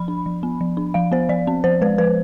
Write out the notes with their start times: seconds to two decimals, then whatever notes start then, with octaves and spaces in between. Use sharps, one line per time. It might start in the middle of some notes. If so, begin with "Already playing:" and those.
Already playing: F3 B5
0.08 D4
0.26 F3
0.43 B3
0.61 F3
0.77 D4
0.94 F3 F5
1.12 B3 C5
1.29 F3 D5
1.47 C4
1.64 F3 C5
1.82 G#3 B4
1.98 F3 B4